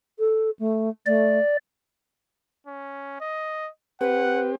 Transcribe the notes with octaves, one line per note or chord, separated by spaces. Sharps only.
A4
A3
A3 D5
C#4
D#5
C4 G4 B4 F#5